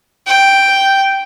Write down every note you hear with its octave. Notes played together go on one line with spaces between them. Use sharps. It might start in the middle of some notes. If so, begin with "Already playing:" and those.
G5